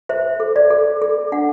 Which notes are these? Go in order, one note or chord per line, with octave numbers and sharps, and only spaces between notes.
C5 E5
A4
D5
A4
A4
D4 F#5